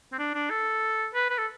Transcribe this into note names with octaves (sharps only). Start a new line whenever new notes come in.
C4
D4
D4
A4
B4
B4
A4